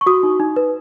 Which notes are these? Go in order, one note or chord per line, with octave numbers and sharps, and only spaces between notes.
C#6
F#4 D#6
D#4
D#4
B4